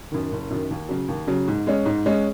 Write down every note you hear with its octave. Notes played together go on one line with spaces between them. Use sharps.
F#2 D#3
F#1
F#2 D#3
D#2
C#3 F#3
D#2
C#3 F#3
G#2
G#3 C#4
G#2
G#3 C#4